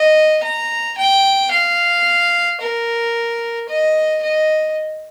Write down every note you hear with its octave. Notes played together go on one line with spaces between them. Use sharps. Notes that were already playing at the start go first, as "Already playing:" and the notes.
Already playing: D#5
A#5
G5
F5
A#4
D#5
D#5